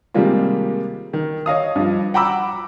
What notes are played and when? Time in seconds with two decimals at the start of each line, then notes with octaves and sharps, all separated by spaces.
0.14 C3 D#3 G3 G#3 A#3 F4
1.13 D#3
1.46 C#5 D#5 F5 D#6
1.75 G2 F3
2.14 F#5 G5 A#5 B5 D6 E6